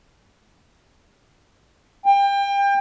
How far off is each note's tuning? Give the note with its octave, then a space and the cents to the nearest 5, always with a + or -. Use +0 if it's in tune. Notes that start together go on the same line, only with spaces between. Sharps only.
G5 +30